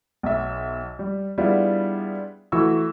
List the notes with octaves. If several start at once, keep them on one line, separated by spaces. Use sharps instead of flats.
B1 E5
G3
G3 B3 D4 E4 F4 G#4
E3 A3 E4 F#4 C#6 E6